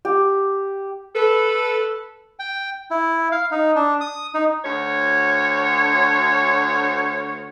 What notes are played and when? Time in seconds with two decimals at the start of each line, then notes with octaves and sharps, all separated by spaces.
0.05 G4
1.16 A4 B4
2.39 G5
2.91 E4
3.32 F5
3.51 D#4
3.76 D4
4.01 D#6
4.34 D#4
4.65 D2 F#4 C#5